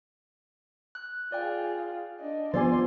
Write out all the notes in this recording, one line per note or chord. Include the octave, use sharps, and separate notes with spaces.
F#6
F4 G#4 D5 G5
D4 D#5
F3 B3 C5 D5 G#5 C6 A6